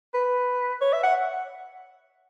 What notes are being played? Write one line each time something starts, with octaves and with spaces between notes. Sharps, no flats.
B4
C#5
E5
F#5